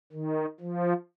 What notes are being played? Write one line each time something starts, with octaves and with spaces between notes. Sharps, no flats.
D#3
F3